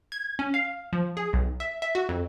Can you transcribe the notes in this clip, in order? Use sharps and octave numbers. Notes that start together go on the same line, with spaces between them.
G#6
C#4
F5
F3
G#4
B1
E5
E5
F#4
F2